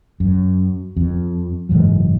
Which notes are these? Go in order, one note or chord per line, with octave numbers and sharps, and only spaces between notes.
F#2
F2
F#1 G#2 E3 F#3